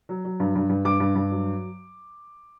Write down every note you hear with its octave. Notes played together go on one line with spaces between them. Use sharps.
F#3
F#3
G2
G2
G2
G2 D6
G2
G2
F#3